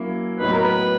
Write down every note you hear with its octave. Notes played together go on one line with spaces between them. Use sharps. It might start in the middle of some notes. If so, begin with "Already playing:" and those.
Already playing: F#3 A#3 C#4 E4
A2 F#3 B3 D#4 B4
A#4
B4